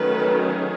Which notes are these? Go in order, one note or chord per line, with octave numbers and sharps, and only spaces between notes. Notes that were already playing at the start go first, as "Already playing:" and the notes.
Already playing: D#3 F#3 A3 C#4 B4
G#4